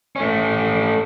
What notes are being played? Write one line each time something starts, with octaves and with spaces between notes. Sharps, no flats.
A3 C#4